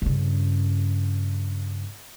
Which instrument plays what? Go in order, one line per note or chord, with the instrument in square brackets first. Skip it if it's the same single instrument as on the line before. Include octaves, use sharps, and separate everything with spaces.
[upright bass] G2 C#3